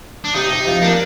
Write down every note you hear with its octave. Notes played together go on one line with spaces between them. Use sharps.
D4
C3 D#4
C3
F3
A#3 D4